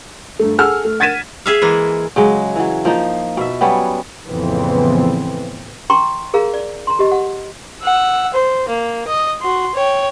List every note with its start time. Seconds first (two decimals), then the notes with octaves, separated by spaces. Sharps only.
0.39 G1 A3
0.58 G#4 A4 F#5 E6 F6
0.85 A3
1.00 F#5 G#6 A6 B6 D#7 E7
1.46 G#4 E5 F5
1.62 E3 G#3 A#3
2.16 C#3 F#3 G#3
2.56 E3 F#3
2.85 F3 A#3 D#4
3.37 B2 E5
3.61 F#3 G3 B3 C#4
4.29 A1 F2 C#3 E3 B3 C4
5.90 G5 A#5 C6 C#6
6.34 G#4 A#4 F5 A#5
6.54 D5
6.87 A#5 C6
6.99 G4 D#5
7.12 F#5
7.82 F#5 E6
8.34 C5
8.69 A#3
9.07 D#5
9.41 F#4 C6
9.75 C#5 G5